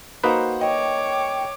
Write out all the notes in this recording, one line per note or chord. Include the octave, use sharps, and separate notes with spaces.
A#3 D#4 F#4 B4 C5 F#5
C#5 D#5 G5 D6